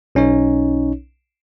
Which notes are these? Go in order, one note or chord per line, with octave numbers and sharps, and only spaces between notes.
B1 C#4 D#4 C#5